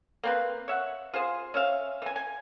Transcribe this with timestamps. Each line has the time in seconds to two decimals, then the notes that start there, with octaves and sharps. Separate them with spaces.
0.23 A#3 C4 B4
0.68 C#5 E5 F#5
1.13 F4 G#4 C5
1.54 C#4 E5 F5
2.02 E3 G#5
2.16 G#5